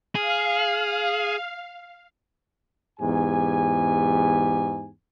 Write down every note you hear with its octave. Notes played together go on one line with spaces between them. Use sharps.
G#4 F5
E2 G#2 G4 G#5